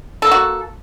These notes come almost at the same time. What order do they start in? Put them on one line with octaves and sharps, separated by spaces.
A4 A#3 F#4